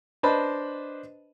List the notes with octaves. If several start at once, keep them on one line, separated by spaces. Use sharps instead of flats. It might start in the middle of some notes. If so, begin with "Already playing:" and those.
D4 B4 C5 D#5 A5 B5